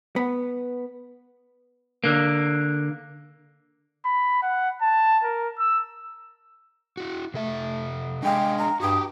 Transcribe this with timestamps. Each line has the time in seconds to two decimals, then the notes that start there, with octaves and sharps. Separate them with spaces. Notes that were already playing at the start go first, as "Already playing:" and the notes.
0.16 B3
2.04 D3 A#3
4.05 B5
4.42 F#5
4.82 A5
5.24 A#4
5.59 E6
6.97 E4 F#4
7.34 C3 A3 A4 E5
8.23 G#3 D4 G#4 F5 G5
8.57 A#5
8.80 G2 F#4 G4 G5 D#6